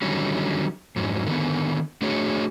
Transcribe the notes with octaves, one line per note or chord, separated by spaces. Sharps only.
D3 D#3 F#3 G3 C#4
F2 G#2 F#3 C#4
D3 D#3 G#3 B3
A3 D4 F#4 G#4 C#5